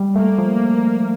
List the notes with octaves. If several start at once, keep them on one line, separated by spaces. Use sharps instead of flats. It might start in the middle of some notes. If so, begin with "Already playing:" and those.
Already playing: G3
A3 A#3
F3